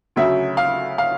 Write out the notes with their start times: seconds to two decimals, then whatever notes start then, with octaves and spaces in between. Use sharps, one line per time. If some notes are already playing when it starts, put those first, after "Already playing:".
0.16 D2 C#3 F#3 E5
0.57 F5
0.98 F5